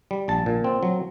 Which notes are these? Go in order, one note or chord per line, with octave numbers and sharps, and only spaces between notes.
G3
A#1 A5
A#2
C4
F#3